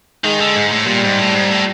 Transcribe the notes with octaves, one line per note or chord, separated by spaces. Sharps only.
D#3 G#3
D3
G#2
A2
A#2 G3
G#2
A2
G#2
A2